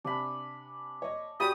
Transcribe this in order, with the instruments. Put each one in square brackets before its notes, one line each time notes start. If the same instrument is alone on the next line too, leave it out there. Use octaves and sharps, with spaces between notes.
[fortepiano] C3 [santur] D4 G#5 B5
[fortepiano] C#5 D#5
[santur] C#4 F#4 G5 [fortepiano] G4 D5 B5 [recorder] D#6